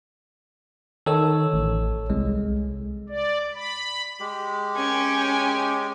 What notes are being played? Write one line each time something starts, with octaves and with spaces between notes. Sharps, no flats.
D#3 A4 C#5 E6
A1
C2 G#3
D5
B5
G#3 G4
C#4 G5 G#5